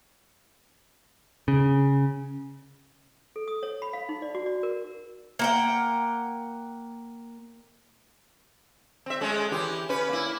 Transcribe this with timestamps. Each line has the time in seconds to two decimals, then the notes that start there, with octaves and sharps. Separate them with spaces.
1.48 C#3
3.36 A4
3.48 D#6
3.63 C#5
3.82 B5
3.93 F5
4.09 D#4
4.22 D5
4.35 F#4
4.46 D5
4.63 A#4
5.39 A#3 F#5 G5
9.06 C4 E5
9.21 G#3 A3 C#4
9.51 E3 G4
9.89 C#4 B4
10.09 A#3 E4